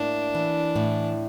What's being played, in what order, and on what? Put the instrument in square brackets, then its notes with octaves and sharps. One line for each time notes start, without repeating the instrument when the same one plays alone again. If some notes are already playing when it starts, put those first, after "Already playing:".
Already playing: [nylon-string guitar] A2 A#3 [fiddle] D4
[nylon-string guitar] E3
A2